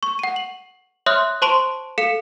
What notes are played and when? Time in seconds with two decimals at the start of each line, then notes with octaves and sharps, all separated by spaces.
0.03 C#6
0.19 F#5 D#7
0.36 F#7
1.06 C#5 E5 C6 D#6 F6 F#6
1.42 C5 A5 C6 C#6 D7 F7
1.98 A4 F5 C#7 E7